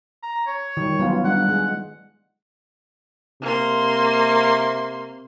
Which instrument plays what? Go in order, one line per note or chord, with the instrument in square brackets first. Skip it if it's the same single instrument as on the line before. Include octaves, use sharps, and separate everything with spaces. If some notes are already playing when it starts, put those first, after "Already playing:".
[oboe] A#5
C#5
[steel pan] D#3 G3
F#3 B3 F4
[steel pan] G3 D4 D#4 [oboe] F#5
[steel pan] G#3
[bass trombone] C3 [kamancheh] A#3 C6